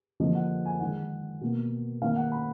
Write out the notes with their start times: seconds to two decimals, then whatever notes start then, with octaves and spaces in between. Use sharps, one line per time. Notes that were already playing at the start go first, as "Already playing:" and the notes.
0.20 D3 F3 A#3 D#5
0.35 F#5
0.66 G#5
0.80 D#3 G#3 F#5
1.41 B2 A#3
2.02 D#3 A#3 F5
2.16 F#5
2.32 B5